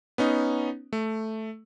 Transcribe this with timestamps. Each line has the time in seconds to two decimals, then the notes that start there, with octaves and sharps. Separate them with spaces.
0.18 B3 C#4 D#4
0.93 A3